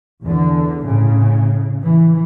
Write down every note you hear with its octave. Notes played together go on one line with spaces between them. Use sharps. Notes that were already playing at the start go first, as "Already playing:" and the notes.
E2 D3
A2 C#3
E3